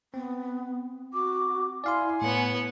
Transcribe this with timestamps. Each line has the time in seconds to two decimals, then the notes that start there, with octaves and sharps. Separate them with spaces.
0.14 B3 C4
1.13 F#4 D6
1.84 E4 D5 F5 G#5 C6
2.22 A2 B3 C#5 F#5